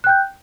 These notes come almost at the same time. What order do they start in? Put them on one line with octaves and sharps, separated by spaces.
F#6 G5 G6